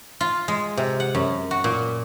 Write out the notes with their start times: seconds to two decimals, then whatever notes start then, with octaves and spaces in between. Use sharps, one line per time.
0.21 F4
0.48 G#3
0.77 C3
1.00 F#5
1.15 F#2
1.51 F#4
1.64 A#2